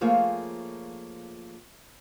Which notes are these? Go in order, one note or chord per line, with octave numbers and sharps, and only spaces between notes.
F3 A3 A#3 F4 G#4 C#5